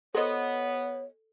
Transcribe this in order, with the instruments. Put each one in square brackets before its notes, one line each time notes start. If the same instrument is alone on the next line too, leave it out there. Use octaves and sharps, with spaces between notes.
[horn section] B3 [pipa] F#4 C5 D#5 [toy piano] A4 [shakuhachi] C#5